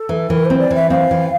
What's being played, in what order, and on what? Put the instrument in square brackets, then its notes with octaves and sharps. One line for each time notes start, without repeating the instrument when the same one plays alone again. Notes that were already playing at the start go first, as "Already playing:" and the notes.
Already playing: [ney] A4
[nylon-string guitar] E3
[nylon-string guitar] E3 [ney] A#4
[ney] C5
[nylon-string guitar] C4
[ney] D5
[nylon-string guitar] E3 [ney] E5
[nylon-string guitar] C4 [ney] F5
[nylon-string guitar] E3